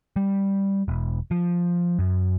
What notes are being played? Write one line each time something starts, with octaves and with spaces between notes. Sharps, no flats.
G3
E1
F3
F#2